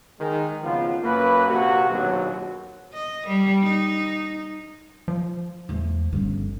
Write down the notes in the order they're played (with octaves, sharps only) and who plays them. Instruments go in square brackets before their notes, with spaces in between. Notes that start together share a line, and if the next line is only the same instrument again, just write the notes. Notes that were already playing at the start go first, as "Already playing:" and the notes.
[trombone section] D#3 G#3
G#1 C#2 C#3 F3 B3 F4
F#2 A#3 B4
A#1 C3 A#3 F#4
A#1 D#2 B2 F#3
[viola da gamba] D#5
G3
D#4
[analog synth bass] F3
[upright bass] E2 A3
G1 C#4